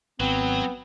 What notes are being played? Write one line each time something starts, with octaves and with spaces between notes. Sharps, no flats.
G#1 F#3 B3 C4